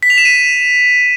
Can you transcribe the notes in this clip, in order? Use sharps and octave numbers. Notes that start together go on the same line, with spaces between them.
B6
F7
E7
D#7